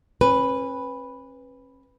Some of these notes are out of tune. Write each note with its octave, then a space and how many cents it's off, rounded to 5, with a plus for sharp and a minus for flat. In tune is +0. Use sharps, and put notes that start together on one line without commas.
C#4 -40 B4 +0